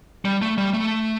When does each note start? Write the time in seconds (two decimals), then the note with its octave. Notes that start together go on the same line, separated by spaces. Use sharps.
0.25 G3
0.42 A3
0.58 G3
0.74 A3